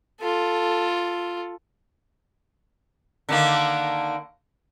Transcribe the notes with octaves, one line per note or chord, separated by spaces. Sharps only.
F4 A4
D3 D#3 A#3